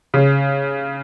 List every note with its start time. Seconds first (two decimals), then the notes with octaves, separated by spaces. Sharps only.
0.14 C#3